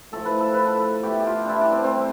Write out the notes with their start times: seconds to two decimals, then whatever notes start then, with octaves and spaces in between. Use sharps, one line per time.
0.12 A2 F3 A3 A4
0.26 B4
0.40 A4
0.54 B4
0.67 A4
1.03 B2 A3 G4
1.20 G4
1.27 F4
1.45 D4 E4
1.61 D4
1.72 C4
1.84 C4
1.95 C3 G3